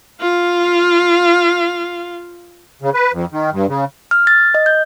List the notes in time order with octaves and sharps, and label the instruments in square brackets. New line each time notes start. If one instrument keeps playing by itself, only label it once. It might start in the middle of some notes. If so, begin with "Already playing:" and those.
[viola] F4 F5
[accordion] C#3
B4
F2
D#3
G2
C#3
[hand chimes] F6
A6
D#5
G6